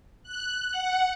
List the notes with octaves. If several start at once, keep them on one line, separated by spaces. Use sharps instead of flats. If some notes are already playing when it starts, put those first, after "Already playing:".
F#6
F#5